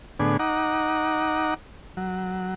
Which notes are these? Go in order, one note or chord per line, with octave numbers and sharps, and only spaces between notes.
A2 D3 B3 D4 G#4
D#4 F#5 A#5 D6
F#3